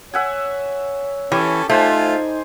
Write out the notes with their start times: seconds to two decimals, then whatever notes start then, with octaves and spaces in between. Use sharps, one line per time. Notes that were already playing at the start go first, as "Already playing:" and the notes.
0.14 C#5 E5 F#5 G#5
1.32 E3 C#4 G4 A4
1.69 A3 D#4 F4 C5 D5 G#5